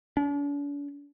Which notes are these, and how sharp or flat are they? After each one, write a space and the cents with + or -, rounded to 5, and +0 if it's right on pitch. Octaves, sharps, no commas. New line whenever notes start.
D4 -45